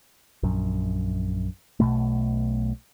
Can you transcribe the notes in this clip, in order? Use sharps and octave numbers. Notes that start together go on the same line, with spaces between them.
A#1 F#2
B1 B2 A3